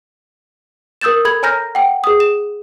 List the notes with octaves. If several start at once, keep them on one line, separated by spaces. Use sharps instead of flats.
A#4 D#6 E6 G6 A6 E7
A4 B5 G#6 F#7
C#5 G#5 A#5 F6 G6 A#6
F#5 G5
G#4 D#6
E7